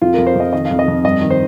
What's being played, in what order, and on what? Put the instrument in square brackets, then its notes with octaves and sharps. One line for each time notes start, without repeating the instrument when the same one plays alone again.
[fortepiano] F2 F4
F2 A#4
C5
F2 D#5
D#3 D#5
F5
F2
D#5
F2
G2 D#5
D#3
C5